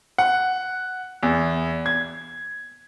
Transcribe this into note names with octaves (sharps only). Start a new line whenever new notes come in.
F#5
E2
G#6